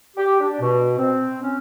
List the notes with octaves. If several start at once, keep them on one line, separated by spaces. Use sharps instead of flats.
G4
D4
B2
C4
C#4